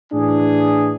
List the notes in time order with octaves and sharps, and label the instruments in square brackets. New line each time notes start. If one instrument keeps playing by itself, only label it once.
[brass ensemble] A2 E3 D4 G#4